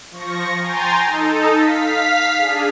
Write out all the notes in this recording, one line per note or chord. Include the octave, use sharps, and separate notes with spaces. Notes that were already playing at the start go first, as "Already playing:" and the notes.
F3 C#6 A#6
G5 G#5 A#5 C6 G6 A6
D#4 A4
F5 B6
D4 G#4